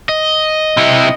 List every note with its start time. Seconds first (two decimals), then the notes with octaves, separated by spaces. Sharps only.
0.09 D#5
0.77 C3 E4